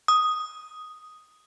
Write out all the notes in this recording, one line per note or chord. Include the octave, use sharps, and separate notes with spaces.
D#6